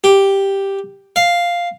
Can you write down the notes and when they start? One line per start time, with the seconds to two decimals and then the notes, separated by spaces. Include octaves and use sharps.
0.04 G4
1.16 F5